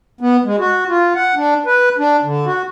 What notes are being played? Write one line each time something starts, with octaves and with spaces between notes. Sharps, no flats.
B3
G#3
F#4
F4
F#5
D4
B4
D4
D3
F#4